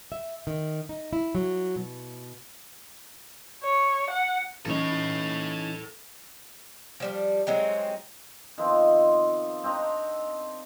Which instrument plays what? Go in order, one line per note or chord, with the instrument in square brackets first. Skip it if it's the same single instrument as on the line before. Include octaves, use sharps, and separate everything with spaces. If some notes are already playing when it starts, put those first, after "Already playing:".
[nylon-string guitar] E5
D#3
D#4
E4
F#3
B2
[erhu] C#5
F#5
[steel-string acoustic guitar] E3 C#4 D#4 [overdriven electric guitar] A4 C#5
[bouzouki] F3 G3 D4
F#3 G#3 C4 D#4
[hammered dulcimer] D#3 F3 B3 C4
C4 D4 D#4 A#5